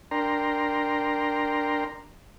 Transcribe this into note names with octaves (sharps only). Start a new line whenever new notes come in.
D4 A#4 G5 A#5 C6